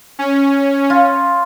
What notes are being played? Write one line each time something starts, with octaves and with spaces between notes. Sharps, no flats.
C#4
F4